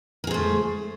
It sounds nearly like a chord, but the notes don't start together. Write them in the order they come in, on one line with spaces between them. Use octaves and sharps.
A#4 G#4 C5 A3